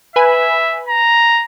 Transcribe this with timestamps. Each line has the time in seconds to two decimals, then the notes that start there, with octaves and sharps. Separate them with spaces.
0.16 B4 E5 G#5 B5
0.88 A#5